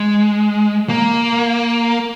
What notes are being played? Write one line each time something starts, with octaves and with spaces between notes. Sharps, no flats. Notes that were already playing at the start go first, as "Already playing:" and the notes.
Already playing: G#3
A#3